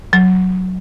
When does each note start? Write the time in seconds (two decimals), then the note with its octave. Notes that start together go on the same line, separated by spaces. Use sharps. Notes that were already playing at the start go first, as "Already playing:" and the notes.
0.13 F#3